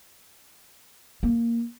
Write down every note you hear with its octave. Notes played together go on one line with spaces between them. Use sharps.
A#3